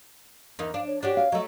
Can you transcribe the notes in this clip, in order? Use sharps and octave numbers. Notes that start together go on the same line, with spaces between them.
E2 A#3 D#4
D4 F5
C#5
D4 F#4 G4 C#5
F5
F#3 A3 D#5